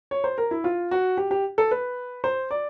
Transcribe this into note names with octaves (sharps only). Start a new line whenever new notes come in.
C#5
C5
A#4
E4
F4
F#4
G4
G4
A4
B4
C5
D5